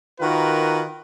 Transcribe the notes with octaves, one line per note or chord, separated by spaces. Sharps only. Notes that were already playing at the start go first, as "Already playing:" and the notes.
D#3 F4 F#4 A#4 B4